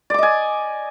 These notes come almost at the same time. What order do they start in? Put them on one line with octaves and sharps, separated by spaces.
D5 D6 D#5 G#5